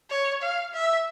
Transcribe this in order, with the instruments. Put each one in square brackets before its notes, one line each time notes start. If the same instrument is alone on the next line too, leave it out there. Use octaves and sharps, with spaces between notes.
[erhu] C#5
F5
E5